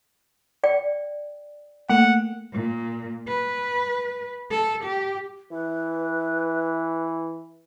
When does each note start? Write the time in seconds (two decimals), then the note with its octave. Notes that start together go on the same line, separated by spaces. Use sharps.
0.64 D5 G5
1.89 A3 A#3 F#5 G5
2.52 A#2
3.28 B4
4.51 A4
4.84 G4
5.51 E3 B4